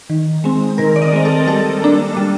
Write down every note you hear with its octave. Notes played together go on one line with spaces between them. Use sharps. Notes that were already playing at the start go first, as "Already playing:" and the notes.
D#3
G#3 C4
D#3 A#4
D5
D#5
G#3 C4
A4
G3 A4
A#3 D4
G3